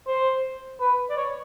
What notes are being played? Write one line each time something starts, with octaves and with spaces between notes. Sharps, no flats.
C5
B4
D5
C#5